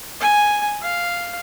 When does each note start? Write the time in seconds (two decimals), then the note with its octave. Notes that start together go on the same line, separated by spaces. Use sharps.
0.21 G#5
0.82 F5